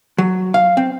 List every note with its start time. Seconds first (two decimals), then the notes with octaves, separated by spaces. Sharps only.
0.18 F#3
0.54 F5
0.77 C4